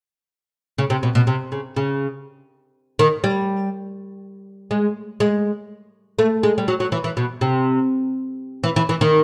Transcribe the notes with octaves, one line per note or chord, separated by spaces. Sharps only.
C#3
C3
B2
B2
C3
C#3
C#3
D#3
G3
G#3
G#3
A3
G#3
G3
F#3
F#3
E3
E3
B2
C3
E3
E3
E3
D#3